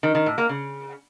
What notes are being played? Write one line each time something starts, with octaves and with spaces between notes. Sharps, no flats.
D#3
D#3
A2
A#3
C#3